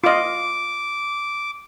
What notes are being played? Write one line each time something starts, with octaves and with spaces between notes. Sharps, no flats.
F4 D#5 D6